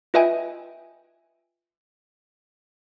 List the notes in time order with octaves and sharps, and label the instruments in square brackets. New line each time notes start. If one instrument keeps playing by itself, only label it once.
[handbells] F4 B4 D#5 E5 G5 G#5